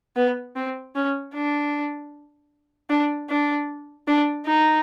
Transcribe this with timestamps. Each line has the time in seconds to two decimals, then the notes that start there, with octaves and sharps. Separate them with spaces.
0.16 B3
0.56 C4
0.95 C#4
1.34 D4
2.90 D4
3.30 D4
4.08 D4
4.46 D#4